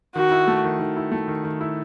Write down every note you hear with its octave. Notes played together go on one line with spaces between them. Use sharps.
D#3 F#4
E4
A3
D#3
D#3
E4
A3
D#3
D#3
E4